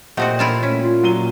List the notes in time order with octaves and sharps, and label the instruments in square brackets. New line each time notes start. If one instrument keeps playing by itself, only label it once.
[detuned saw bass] A#2 [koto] A3 C4 F#4 [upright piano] G4 D#5 F#5
[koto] E4 F4 A5
[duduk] A3 [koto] C#4 [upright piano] B6
[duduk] F4
[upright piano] F#3 D#7 G7